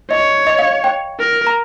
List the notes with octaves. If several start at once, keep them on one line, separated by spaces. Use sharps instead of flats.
C#5 D#5
D#5
F5
G5
A#4
A#5